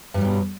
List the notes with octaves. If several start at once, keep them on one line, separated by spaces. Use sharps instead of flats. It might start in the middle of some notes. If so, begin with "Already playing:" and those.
G2 B2 F#3 G3